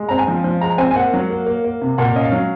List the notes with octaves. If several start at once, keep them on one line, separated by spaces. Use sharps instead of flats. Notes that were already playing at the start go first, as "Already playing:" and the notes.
Already playing: G#3
C4 A#5
G#5
F3
F3
G#3 A#5
C4 G#5
G#5
A#3 F#5
F#3
A#3
A#3
A#3
C3
A#2 F#5
F5
C#4 D#5
F5
F#3